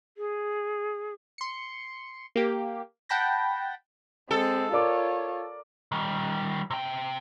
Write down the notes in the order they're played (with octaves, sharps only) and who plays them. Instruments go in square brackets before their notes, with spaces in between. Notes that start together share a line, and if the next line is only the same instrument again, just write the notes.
[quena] G#4
[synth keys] C6 C#7
A#3 G4
F#5 G5 A5 B5 G6 A#6
[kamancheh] G#3 C4 [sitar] A4
[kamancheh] F4 C#5 [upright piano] A#4 D5 D6
[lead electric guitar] D#3 G3
C3 G5